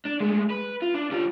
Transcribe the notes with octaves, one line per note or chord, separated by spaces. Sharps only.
D4
G#3 A3
B4
F4
D4
G3 F4